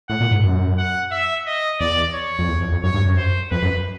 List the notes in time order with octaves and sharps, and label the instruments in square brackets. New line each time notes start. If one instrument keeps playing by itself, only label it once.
[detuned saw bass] A2 [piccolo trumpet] F#5
[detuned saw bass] A#2
G#2
F#2
[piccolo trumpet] F#5
E5
D#5
[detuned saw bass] E2 [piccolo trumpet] D5
[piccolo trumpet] C#5
[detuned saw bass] F2
E2
F2
F2
[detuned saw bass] F#2 [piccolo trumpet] C#5
[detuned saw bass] G2
F#2
[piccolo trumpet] C5
[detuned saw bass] F2 [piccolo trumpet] B4
[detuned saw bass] F#2